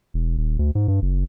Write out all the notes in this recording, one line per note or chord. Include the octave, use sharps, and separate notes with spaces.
E1
D#1
D2
G#2
G2
F#1